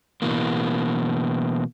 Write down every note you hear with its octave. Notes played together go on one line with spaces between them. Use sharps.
B2 E3 A#3